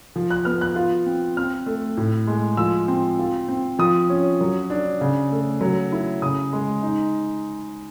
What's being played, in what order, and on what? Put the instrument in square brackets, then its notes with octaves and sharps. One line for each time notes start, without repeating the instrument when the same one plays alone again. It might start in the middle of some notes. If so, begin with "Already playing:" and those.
[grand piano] F3
F#6
B3 F6
F#6
F4
C4
C4 F6
A3
A2
G#3
F3 E6
C4
F4
C4
F3 D#6
C#4
F#3
D4
C#3
A3
F#3
E4
C#3 D#6
G#3
D#4